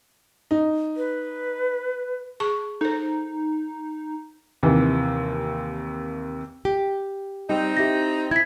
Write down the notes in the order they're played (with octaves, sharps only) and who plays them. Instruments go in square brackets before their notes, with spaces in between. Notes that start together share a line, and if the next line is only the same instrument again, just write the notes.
[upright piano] D#4
[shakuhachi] B4
[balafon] G#4 A5 C#6
[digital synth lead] D#4 [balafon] A4 C5
[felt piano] D#2 C3 E3
[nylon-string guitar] G4
[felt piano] G3 [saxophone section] C4 D#4
[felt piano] E4 G4 [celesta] A#6
[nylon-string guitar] E4 [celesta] G#6 B6